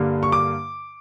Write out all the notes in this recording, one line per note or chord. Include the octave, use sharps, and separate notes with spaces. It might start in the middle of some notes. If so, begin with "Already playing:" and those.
Already playing: G2 D3 G3 A#3
C#6
D6